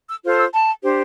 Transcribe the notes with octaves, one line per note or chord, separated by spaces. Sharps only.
E6
F4 A4 C5
E6
A5
D4 G4 C5